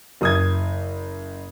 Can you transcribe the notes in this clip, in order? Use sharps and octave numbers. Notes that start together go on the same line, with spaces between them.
F#1 D#6 G#6